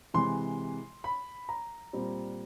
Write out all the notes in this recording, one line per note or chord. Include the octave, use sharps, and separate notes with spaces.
C3 E3 G#3 C6
B5
A#5
A#2 G3 C4